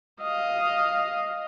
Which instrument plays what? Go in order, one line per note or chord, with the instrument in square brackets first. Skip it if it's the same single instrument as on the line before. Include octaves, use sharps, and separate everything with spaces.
[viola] D#5 F5